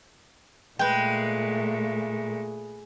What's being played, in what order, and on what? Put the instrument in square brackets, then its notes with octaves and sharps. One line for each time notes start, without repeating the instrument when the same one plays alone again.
[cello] A#2 A3 [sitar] G#3 [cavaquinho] B4 G5